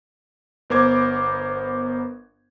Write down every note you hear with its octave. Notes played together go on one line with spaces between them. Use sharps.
G1 B3 A#4 C5 D6 G#6